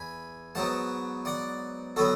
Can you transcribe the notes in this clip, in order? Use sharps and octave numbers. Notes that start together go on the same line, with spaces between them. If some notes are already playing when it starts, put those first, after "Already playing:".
Already playing: E2 G#5 B5
G#2 F#3 B3 F#5 A5
D5 F#5
D3 F#3 B3 F#4 A4